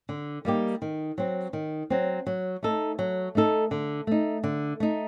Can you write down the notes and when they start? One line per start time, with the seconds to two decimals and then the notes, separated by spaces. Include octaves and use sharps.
0.09 D3
0.45 G3 A#3 D#4 G4
0.82 D#3
1.18 F#3 C4
1.53 D#3
1.90 F#3 C4
2.27 F#3
2.63 A3 D#4 A4
2.99 F#3
3.35 A3 D#4 A4
3.71 D3
4.07 A3 D#4
4.44 D3
4.80 A3 D#4